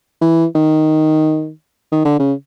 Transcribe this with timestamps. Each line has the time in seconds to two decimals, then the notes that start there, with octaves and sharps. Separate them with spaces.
0.21 E3
0.55 D#3
1.92 D#3
2.05 D3
2.19 C#3